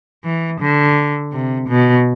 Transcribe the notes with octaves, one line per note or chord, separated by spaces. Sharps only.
E3
D3
C3
B2